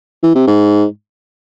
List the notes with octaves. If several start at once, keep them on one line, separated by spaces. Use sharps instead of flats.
E3
C3
G#2